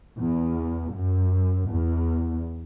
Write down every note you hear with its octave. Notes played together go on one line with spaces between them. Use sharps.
E2
F#2
E2